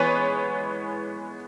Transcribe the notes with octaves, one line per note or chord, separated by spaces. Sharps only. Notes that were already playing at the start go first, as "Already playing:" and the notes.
Already playing: E3 G#3 B3 B4 C#5